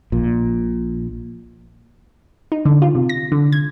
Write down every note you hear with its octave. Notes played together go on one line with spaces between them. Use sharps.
A#1 A#2
D#4
D3
F4
C3
A#6
D3
G#6